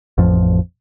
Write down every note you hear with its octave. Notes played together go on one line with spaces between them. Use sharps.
A1 F2 F3